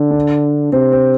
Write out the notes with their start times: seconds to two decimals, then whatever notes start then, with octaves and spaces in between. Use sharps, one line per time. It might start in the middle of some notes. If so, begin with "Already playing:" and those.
Already playing: D3
0.11 D4
0.72 C3 C4
0.92 C4